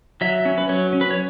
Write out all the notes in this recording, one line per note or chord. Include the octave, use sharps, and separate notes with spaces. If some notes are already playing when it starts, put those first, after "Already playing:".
F#3 E5
C#4
B4
F#3 C#5
C#4
B4
C#5